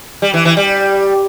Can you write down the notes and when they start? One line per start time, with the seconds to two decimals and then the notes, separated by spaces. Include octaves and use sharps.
0.22 G3
0.34 E3
0.45 E3
0.57 G3